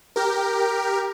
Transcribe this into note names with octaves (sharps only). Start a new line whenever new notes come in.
G4 A#4